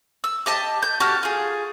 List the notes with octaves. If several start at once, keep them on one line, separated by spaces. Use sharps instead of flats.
E6
G4 D#5 A5
G6
F#4 G4 A5 F6
F4 G#4